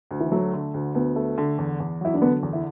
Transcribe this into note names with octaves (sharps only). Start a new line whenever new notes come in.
D2
E3
F#3 A3
D3
D2
D2 B3
A3
D3
E2
E2
F#3 E4
D4
D3 B3
E2
E4